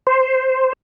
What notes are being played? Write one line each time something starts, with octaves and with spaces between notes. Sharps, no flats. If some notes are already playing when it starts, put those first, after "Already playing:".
C5